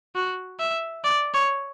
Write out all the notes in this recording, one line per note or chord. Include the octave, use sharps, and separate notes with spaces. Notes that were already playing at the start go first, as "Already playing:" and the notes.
F#4
E5
D5
C#5